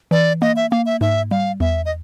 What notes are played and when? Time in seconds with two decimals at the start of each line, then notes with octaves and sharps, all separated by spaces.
0.11 E3 D5
0.42 A#3 D#5
0.56 E5
0.71 A#3 F5
0.86 E5
1.01 G#2 E5
1.31 G3 F5
1.60 E2 E5
1.85 D#5